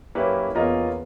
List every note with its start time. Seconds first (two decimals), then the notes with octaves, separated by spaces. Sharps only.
0.15 F#2 A#3 C#4 E4 G4 B4
0.54 E2 A#3 C#4 F4 A#4 D#5